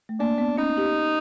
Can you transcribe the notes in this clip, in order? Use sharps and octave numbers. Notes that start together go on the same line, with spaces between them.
A3
A#3 D4
B3
C#4 D#4
G4